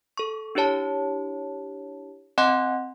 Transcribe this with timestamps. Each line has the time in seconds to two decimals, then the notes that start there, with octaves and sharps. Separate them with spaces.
0.17 A4 C#6
0.55 D4 E4 G4 C#5 A5
2.38 C4 D#5 F#5 G#5 C6 F#6